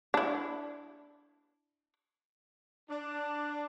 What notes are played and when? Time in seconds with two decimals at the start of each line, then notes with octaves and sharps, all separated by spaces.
0.14 D4 E4
2.89 D4